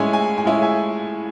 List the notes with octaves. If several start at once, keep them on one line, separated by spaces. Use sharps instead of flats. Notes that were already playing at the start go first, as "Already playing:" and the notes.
Already playing: A2 G#3 C#4 E4 G#5
G#5
G#5
A2 G#3 C#4 E4
E5 G#5